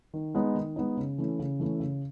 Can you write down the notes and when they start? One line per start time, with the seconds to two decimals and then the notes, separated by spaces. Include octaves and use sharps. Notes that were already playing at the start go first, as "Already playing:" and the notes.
0.13 D#3
0.35 G#3 B3 D#4
0.55 D#3
0.76 G#3 B3 D#4
0.97 C#3
1.18 E3 A3 C#4 E4
1.39 C#3
1.59 E3 A3 C#4 E4
1.80 C#3